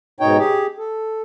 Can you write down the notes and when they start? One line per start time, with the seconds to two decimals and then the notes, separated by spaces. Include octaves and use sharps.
0.20 G#2 B2 D#4 C#5 G5
0.38 G4 G#4
0.78 A4